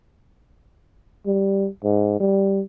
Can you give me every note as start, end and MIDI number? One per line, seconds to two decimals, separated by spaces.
1.26 1.68 55
1.84 2.19 44
2.20 2.61 55